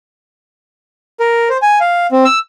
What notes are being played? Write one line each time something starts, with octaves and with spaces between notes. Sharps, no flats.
A#4
C5
G#5
F5
C4
E6